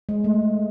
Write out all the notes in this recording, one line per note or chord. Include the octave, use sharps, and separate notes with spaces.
G#3
A3